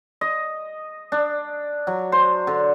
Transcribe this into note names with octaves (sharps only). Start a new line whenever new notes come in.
D#5
D4
F#3
C5
D3